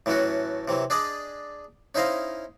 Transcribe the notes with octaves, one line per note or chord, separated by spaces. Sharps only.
A2 E3 F#3 A3 C#4 F#4
C3 E3 F#3
D4 G#4 D5 D#5
C#4 D#4 E4 C5 D#5 F5